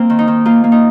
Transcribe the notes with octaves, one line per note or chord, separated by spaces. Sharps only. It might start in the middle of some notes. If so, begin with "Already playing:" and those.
Already playing: A#3 C4
D#3
D#4
D#3
A#3 F4
A#3
D#4